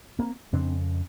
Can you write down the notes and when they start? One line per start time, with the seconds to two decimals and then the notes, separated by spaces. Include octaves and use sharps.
0.19 A#3 C4
0.52 F2 C#3 C4 D4